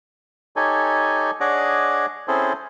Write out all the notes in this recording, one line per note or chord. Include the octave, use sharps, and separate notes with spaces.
D#4 G4 A4 C#5 G#5
D4 G#4 C#5 D#5 F#5 D6
C4 C#4 E4 G#4 A4 C5